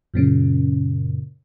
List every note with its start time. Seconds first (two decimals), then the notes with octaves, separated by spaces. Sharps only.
0.14 F#2 A#2 C#3